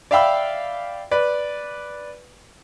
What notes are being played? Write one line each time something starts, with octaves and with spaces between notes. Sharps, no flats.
D5 E5 F5 G5 B5 E6
B4 D5